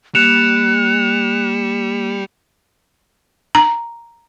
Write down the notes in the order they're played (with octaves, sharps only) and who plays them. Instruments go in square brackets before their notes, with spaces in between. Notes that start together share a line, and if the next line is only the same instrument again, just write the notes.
[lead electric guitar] G3 [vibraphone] A#3 [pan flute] F#6 [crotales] C#7 E7 F7
[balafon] A#5